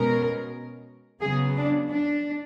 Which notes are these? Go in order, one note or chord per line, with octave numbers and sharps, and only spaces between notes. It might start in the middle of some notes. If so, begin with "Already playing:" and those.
Already playing: B2 G#3 C#4 A#4
C#3 F#3 B3 G#4
D4
D4